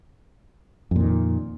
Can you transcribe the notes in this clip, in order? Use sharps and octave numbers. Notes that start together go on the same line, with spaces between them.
F2 A#2 D#3